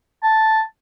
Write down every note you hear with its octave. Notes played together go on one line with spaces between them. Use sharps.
A5